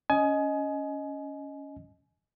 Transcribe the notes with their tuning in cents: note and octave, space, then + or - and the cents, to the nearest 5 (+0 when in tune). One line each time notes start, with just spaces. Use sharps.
C#4 +15 D#5 +0 G#5 +25